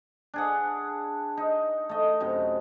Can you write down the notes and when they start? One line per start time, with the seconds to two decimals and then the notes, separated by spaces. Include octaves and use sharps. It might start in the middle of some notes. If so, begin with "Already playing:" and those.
0.34 D4 G#4 F#5
1.37 D#4
1.89 A3 D#5
2.20 F#2 C3 D#4